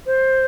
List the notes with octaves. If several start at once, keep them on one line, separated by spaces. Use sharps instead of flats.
C5